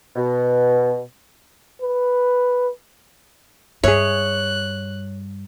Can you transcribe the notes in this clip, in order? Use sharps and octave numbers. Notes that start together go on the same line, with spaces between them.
B2
B4
G2 G#4 C#5 E5 F#6